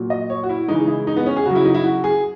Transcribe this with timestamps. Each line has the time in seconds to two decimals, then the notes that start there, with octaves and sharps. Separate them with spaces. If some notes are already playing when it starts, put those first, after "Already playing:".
Already playing: A#2 F#3
0.10 D#5
0.30 C#5
0.43 F#4
0.49 E4
0.68 C#3 E3 G#3 D#4
0.88 E4
1.07 D#4
1.17 B3
1.26 C#4
1.36 G#4
1.45 C#3 F#3 F#4
1.55 E4
1.65 D#4
1.74 E4
1.84 F#4
2.04 G#4